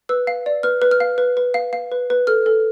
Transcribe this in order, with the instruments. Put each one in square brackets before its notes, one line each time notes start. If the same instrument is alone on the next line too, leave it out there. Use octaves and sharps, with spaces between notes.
[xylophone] B4 E6
F5
D5
B4 F6
B4
F6
F5
B4
B4
F5
F5
B4
B4
A4 F6
A4